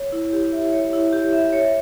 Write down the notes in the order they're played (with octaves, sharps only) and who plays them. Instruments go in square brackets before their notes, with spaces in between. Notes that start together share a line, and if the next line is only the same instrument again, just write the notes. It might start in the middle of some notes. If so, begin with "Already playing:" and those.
Already playing: [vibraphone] C#5
E4
G4
E5
C#5
E4
G4
E5
C#5